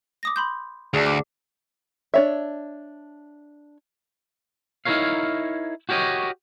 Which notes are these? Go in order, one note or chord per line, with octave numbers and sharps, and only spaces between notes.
D6 D#6 A#6
B5 C6 G6
D2 G#4 D5 A5
D6
D4 C#5 E5
D#4 E4 F#4 A#4 C#5 F5
F#4 G4 A#4 C#5 D#5